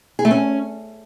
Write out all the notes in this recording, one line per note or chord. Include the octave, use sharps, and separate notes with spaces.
G#4
A3
C#4